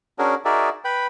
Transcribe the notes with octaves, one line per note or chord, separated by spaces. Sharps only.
C#4 D4 F#4 G#4 A#4
D#4 F#4 G#4 A#4 D5 E5
B4 G5 B5